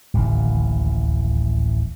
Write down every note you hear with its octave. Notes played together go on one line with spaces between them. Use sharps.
D1 A1 D#2